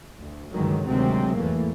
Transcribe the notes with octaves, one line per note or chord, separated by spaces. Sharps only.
D2
C#2 G2 D3 D#3 F#3 G#3
D2 C3 D#3 F#3 G#3 C4
E2 G#2 E3 A3 A#3